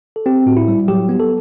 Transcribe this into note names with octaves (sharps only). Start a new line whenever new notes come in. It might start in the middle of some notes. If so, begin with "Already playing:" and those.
A4
C4 G4
A2 F#4
E4
G3
F#3 G4
B3
A4